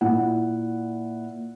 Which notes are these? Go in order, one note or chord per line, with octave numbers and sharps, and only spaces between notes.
A#2 E4 F#5